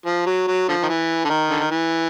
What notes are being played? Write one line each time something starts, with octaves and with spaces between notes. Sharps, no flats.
F3
F#3
F#3
D3 F3
D#3
E3
D3
D#3
D3
D#3
E3